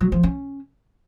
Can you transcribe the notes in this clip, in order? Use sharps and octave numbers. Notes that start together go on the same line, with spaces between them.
F#3
F3
C#4